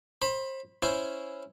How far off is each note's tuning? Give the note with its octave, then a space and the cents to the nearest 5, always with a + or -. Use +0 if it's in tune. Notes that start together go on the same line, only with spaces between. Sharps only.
C5 +30 B5 +0
C#4 +0 E4 +0 C5 +0